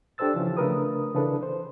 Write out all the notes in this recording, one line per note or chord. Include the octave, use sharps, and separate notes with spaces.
D4 G4 A4 C5 E6 A6
C#3 E3 F3 C#4
C#3 A3 D4 A#4 B4 D#6
C#3 E3 D4 A4 B4
C5